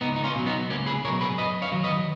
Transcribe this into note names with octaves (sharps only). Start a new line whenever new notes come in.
C#2 B3 D#4
D#4
C#4 F4
B2 F#3
B3 D#4
C#2 A#3 C#4
G#4 B4
B2 F#3 A#4 C#5
G#4 B4
F#2 B4 D#5
C#5 F5
D#3 F#3
B4 D#5